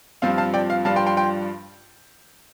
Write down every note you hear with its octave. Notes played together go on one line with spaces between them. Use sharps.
G2 F3 C4 F4 F5
F5 A5
D5 G5
F5
G2 F3 D4 F4 F5 A5
G5 C6
G5 C6
G5 C6